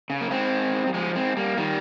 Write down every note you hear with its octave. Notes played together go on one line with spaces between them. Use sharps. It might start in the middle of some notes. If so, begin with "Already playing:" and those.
C#3
A#3
G#3 C4
G3
F3 G#3
G#3 C4
G3 A#3
D#3 G3